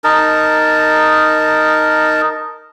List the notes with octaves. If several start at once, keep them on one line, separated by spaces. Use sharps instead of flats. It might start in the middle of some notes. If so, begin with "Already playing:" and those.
D#4 A#4 A5